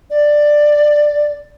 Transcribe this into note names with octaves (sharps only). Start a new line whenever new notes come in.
D5